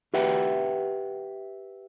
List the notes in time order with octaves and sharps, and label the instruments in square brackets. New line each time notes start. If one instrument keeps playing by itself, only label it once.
[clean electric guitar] G4 B4 E5 F#5 G5